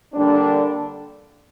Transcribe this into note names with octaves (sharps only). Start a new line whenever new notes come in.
D3 G3 A#3 D4